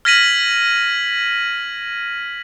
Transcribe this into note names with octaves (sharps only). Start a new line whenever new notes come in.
F6 G#6 A#6 B6 D#7 F#7